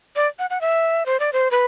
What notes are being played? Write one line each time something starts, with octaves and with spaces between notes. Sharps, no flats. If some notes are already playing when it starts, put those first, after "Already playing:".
D5
F#5
F#5
E5
C5
D5
C5
B4